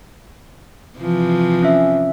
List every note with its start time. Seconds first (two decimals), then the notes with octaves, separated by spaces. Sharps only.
0.99 C3 E3 F3
1.62 C#4 E5